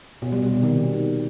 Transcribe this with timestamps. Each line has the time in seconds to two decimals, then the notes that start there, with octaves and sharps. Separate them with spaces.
0.22 B2
0.32 G3
0.42 B2
0.53 C3
0.63 D#3